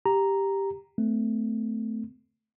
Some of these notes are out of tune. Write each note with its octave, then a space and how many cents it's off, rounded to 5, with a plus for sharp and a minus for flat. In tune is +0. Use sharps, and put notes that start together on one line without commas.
G4 +0 A#5 +0
A3 +0 C4 -40